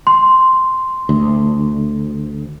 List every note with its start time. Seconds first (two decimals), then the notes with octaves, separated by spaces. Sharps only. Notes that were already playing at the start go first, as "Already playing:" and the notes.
0.07 C6
1.09 D2